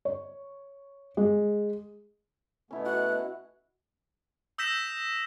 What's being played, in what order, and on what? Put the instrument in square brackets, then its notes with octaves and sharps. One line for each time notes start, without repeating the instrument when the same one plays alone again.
[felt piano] C#5
G#3
[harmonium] B2 A3 B3 [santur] C#4 E4 D#5
[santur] F#4 [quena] F#6
[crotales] D#6 E6 G6 A#6 B6 E7